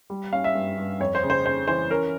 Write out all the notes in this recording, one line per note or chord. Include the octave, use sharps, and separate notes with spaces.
G3
C#4 F5
E5
G2
G2
F2 C#5
C5
C#3
C5
C#3 C5
E3 C5
C#4 A#4